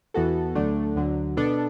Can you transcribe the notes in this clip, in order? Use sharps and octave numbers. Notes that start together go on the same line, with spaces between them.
E2 E3 B3 F#4 A4
D2 D3 F#3 A3 D4
D2 D3 F#3
B2 B3 D4 A4